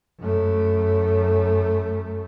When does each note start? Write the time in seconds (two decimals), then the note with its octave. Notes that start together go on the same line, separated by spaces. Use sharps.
0.19 F#2 A3